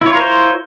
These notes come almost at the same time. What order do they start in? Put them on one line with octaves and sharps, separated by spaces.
E4 C#5 F4 A#4 C5